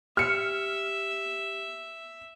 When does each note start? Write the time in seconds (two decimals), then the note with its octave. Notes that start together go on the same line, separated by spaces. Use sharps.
0.17 G4 E5 F6 C#7